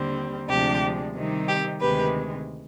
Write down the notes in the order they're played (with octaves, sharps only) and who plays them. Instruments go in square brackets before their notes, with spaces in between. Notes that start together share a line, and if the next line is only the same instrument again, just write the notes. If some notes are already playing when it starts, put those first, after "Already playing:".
Already playing: [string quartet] D#2 D3 G3 C4
D2 C3 F3 G#3 D4 G4
C3 D#3 G3 C4 D#4
G4
D2 C3 D#3 G#3 G4 B4